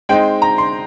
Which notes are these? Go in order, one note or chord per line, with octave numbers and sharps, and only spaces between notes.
G#3 C4 D#4 G5
A#5
C6